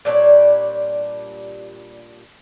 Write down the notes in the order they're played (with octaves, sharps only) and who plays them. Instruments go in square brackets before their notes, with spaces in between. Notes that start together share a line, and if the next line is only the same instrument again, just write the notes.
[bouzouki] A#2 G3 D4 C#5